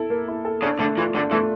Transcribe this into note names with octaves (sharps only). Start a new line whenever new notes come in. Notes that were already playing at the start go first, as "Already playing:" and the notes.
Already playing: E4 A4
A#3
E4
A4
C#3 D4
D3 A3
E3 F4
D3 D4
E3 A3